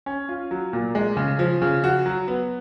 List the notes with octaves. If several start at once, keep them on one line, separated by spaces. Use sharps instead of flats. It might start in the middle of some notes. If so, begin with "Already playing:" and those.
C#4
F4
F#3
A#2
G#3
C#3
F3
C#3
F#4
F#3
B3